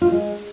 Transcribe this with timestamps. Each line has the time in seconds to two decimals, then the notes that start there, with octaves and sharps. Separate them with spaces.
0.02 F4
0.07 A3
0.12 G#3